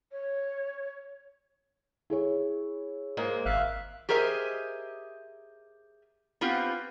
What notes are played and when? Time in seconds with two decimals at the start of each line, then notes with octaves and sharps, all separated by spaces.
0.12 C#5
2.10 E4 G#4 C#5
3.17 G#2 G#3 A#3
3.46 G#1 E5 F5 F#6
4.09 G4 G#4 A#4 C5 D#5 E5
6.41 B3 C4 F4 G4